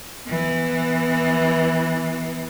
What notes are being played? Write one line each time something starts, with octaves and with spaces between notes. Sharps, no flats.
E3 B3